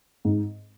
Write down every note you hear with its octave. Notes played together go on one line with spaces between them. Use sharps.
G#2